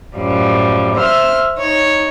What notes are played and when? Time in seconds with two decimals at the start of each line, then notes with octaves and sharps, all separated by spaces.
0.16 F#2 A2 F3 G3
0.95 C5 E5 E6 F6
1.56 D#4 C#5